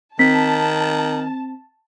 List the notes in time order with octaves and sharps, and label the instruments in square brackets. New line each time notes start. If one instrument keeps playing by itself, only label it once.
[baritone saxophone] D#3 [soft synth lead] C4 [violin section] A5 [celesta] B6